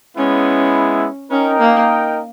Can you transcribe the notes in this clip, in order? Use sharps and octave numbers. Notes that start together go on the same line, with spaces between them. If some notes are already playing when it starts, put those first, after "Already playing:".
G#3 B3 C#4 E4
C#4 D#4 A#4 D#5 G5
A#3